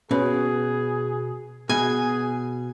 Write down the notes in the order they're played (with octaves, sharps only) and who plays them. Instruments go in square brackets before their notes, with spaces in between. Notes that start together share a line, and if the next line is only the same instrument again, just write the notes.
[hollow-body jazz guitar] B2 [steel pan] C#4 B4 [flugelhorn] G#4
[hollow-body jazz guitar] B2 [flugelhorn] G#4 [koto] G#5